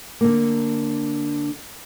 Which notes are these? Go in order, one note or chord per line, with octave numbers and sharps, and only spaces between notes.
D3 A#3